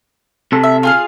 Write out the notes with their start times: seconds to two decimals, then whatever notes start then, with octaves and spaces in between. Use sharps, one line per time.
0.52 C3 A4
0.63 E5
0.83 F4 G#4 F5